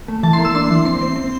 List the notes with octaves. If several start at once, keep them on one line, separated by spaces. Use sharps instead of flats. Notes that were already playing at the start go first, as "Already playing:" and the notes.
A3
E3 A5
C6
A#3
E6
D4 C6
E3
C4 C6
C4
C4